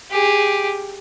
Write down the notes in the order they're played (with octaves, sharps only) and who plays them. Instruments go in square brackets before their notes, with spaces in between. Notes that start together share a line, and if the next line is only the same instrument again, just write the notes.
[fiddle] G4 G#4